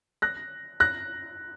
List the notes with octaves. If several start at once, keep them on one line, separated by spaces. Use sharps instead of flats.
F#6 A#6
F#6 A#6